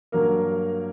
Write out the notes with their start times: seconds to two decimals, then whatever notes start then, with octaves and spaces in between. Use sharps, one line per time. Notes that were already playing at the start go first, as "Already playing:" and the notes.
0.12 G2 F#3 A#3 A#4